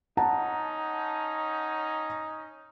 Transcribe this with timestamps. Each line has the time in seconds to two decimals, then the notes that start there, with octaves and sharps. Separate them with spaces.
0.17 C#4 D#4 F#5 A5 A#5